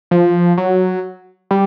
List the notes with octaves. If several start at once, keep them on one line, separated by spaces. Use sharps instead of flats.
F3
F#3
G3